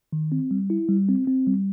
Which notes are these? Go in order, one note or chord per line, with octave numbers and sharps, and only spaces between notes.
D#3
C4
G3
E4
G3
C4
C4
G3